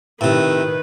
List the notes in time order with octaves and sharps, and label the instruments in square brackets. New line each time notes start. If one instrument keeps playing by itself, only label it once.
[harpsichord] A2 C3 [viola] D#3 B4